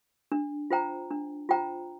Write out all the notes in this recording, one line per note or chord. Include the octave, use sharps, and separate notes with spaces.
D4
F4 C5 G5 A#5
D4
F4 C5 G5 A#5